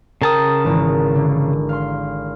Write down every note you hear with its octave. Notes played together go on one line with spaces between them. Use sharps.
C#3 A#4 G5 A5 A#5 D#6
G#1 E3 A#5
D3
F5 C6